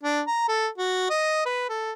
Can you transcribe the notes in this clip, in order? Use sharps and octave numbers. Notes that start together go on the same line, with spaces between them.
D4
A#5
A4
F#4
D#5
B4
A4